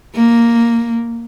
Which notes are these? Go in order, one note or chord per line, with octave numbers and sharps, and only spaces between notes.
A#3